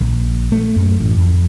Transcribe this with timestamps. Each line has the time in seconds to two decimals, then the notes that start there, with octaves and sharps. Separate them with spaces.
0.01 A#1
0.52 A3
0.76 F#2
1.00 A1
1.18 F2